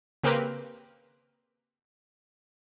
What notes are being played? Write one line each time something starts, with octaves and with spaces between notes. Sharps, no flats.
C#3 A#3 C4 G4 A#4 B4